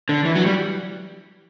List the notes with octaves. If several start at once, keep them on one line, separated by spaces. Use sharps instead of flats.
D3
E3
F#3
G3